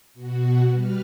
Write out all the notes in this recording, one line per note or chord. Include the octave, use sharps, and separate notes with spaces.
B2 F#4
G3 B4 F6